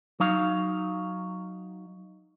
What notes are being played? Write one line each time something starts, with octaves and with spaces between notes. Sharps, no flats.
F#3 D#4 F5